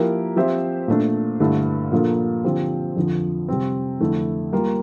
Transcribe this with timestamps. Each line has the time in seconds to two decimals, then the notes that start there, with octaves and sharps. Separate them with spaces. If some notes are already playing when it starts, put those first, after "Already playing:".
Already playing: F3 A#3 E4 G4 A#4
0.36 F3 C4 G4 C5 E5
0.88 A#2 A3 D4
1.40 G2 D3 A3 E4
1.92 A#2 F3 A#3 D4 A4
2.44 D3 F3 C4 G4 C5
2.96 F2 D3 F3
3.49 C3 G3 C4
4.00 F2 D3 A3 E4
4.52 G3 A#3 F4